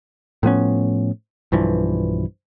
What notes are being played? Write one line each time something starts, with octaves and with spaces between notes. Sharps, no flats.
A2 F3 B3 C#4
B1 G2 E3 F3